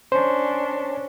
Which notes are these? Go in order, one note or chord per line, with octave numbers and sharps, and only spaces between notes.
C#4 D4 C5